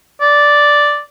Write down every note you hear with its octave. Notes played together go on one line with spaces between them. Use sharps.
D5